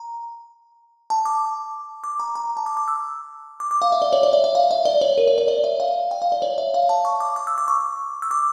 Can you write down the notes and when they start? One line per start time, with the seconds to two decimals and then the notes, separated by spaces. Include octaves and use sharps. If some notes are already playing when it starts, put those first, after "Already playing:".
Already playing: A#5
1.10 A5
1.25 D6
2.04 D6
2.20 A#5
2.35 A#5
2.57 A5
2.66 D6
2.77 D6
2.88 E6
3.60 D6
3.71 D6
3.82 F5
3.92 E5
4.02 D5
4.13 C#5
4.23 D5
4.33 E5
4.44 E5
4.55 F5
4.71 E5
4.85 D5
5.01 C#5
5.18 A#4
5.28 C#5
5.38 C#5
5.48 D5
5.64 E5
5.80 F5
6.11 G5
6.22 F5
6.32 D5
6.42 C#5
6.58 E5
6.74 F5
6.89 A5
7.05 C#6
7.20 D6
7.36 D6
7.47 E6
7.58 D6
7.68 C#6
8.22 E6
8.31 D6